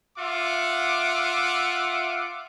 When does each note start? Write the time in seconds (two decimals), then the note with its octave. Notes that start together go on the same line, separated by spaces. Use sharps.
0.18 F4 E5 F#5 D6